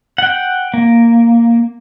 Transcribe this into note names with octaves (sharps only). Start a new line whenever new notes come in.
F#5 G5
A#3